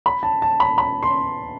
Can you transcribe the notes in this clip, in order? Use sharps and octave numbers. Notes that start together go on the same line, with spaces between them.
B5
A5
A5
B5
B5
C6